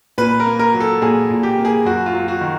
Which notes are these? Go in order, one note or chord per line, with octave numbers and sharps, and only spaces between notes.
A#2 B4
A#4
A#3
A#4
F#3
A4
A#2 G#4
A#2
G4
A#3
G#4
F#2 F#4
F4
F#3
F#4
D#3